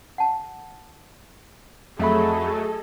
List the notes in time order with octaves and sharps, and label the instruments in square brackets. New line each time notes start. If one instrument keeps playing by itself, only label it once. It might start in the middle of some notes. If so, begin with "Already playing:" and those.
[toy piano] F#5 A5
[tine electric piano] F2 E5 B5 [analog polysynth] F#3 A3 [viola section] G#4 A4 D#5